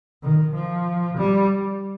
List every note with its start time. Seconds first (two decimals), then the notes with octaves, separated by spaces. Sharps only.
0.23 D#3
0.54 F3
1.17 G3